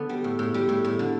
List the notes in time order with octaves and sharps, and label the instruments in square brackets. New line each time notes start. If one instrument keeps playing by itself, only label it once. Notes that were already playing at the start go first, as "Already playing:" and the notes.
Already playing: [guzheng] D3 B3 D4
G3
A2
A2
G3
A2
A2
D3